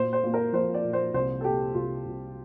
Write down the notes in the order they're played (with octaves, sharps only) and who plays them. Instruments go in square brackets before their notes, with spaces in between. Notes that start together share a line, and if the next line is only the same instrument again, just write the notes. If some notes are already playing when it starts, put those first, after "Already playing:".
Already playing: [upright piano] A#2 C5
C5
A#2
A#4
F3 C5
D5
A#2
C5
C2 C5
A4
A#2 G4
C2 F4
C2